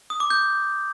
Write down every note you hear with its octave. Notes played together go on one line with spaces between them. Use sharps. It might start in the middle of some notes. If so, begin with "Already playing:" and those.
D#6
D6
G6